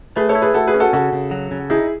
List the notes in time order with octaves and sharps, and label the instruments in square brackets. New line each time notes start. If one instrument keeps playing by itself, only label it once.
[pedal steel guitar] A3 [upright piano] G#4 B4
[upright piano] A4 C#5
[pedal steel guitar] E4
[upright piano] G#4 B4
[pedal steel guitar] A3 [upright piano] F#4 A4
[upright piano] G#4 B4
[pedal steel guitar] C#4
[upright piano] F#4 A4
[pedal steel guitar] C#3 [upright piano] F#4 A4
[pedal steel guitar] C#3
F#3
C#3
[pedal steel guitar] D#4 [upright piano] E4 G#4